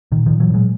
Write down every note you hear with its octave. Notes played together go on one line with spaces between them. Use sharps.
A#2 D#3
A#2 D#3 F3
E3 F#3
A#2 F#3 G#3